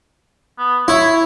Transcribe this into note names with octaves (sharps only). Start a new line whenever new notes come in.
B3
E4 C#5